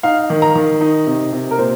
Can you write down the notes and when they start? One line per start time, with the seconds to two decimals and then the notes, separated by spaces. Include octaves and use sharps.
0.03 D#4 F5
0.30 D#3
0.42 A#5
0.55 D#3
0.81 D#4 D#5
1.07 C3
1.33 C3
1.51 A#4
1.58 A#2 C5